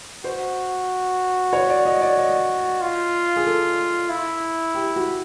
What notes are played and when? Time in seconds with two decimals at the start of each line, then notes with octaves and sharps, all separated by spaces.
0.24 F#4 C5
1.53 C#5
1.69 D5
1.85 D#5
2.01 D5
2.18 D#5
2.81 F4
3.36 G#4
3.47 A4
4.10 E4
4.75 G4
4.96 F#4